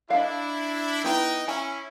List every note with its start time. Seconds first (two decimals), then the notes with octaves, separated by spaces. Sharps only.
0.10 D4 E4 D#5 F5
1.04 B3 D#4 E4 G5
1.48 C#4 E4 G#5